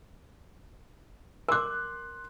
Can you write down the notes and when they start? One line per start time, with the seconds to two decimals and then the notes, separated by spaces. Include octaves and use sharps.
1.48 A#4 C6 D6 F#6